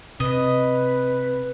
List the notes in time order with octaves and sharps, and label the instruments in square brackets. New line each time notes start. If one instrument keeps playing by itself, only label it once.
[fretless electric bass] C3 [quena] B4 [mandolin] D#5